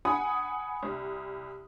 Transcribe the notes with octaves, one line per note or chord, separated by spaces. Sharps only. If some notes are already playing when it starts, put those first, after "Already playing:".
F#5 G#5 B5 D#6
C2